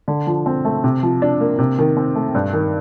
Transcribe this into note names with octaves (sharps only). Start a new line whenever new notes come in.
D3
F3
C4
A3
C3
F3
D4
A#3
C3
D#3
C4
A3
G2
D#3